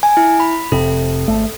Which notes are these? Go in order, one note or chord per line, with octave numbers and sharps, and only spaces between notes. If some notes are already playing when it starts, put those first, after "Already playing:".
G#5
E4
B5
F1 C3 A4
G#1 A3